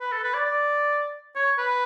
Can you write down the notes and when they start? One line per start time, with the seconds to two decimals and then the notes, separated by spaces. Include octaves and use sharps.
0.01 B4
0.12 A4
0.23 B4
0.34 D5
0.45 D5
1.36 C#5
1.58 B4